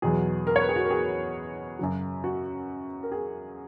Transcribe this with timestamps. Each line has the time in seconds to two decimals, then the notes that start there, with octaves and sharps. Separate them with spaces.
0.02 E2 B2 F#3 G#4
0.47 A#4
0.56 C#5
0.61 B4
0.69 G#4
0.76 F#4
0.85 A#4
0.90 G#4
1.79 F#2 C#3 F#3
2.24 F#4
3.03 A#4
3.12 G#4